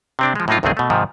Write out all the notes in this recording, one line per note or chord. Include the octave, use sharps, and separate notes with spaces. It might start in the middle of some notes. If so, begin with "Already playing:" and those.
C3 C4 D4
F3 G#3
A2 F#3 A#3 D#4 F4
C2 G2 D#3 A3 C4 G#4
B2 A3
G#2 C3 D#3 F3